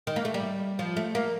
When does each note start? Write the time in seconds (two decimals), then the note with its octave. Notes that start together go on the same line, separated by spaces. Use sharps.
0.07 D#3
0.16 A#3
0.25 A3
0.34 G3
0.79 F3
0.97 A3
1.15 A#3